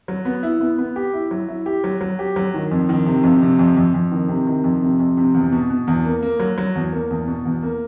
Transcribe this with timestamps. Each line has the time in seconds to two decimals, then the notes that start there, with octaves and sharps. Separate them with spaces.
0.08 F#3
0.25 B3
0.43 E4
0.61 B3
0.78 B3
0.96 G4
1.14 E4
1.31 F#3
1.49 E4
1.66 G4
1.84 F#3
2.01 F#3
2.19 G4
2.36 F#3
2.54 D#3
2.71 F2
2.89 D#3
3.06 C3
3.23 F2
3.42 C3
3.59 F2
3.77 F2
3.94 F2
4.11 D#3
4.29 C3
4.47 D#3
4.64 F2
4.82 C3
4.99 F2
5.17 C3
5.34 E2
5.52 B2
5.70 B2
5.87 E2
6.05 A#3
6.22 A#3
6.40 F#3
6.58 F#3
6.75 E2
6.92 A#3
7.10 E2
7.28 B2
7.45 E2
7.63 A#3